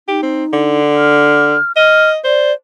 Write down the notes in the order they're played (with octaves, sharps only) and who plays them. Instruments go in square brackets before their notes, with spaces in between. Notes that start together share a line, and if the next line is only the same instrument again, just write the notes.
[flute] D#4 [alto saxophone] G4
[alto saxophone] C4
D3
[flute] F6
[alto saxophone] D#5 [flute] F6
[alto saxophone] C5 [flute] D5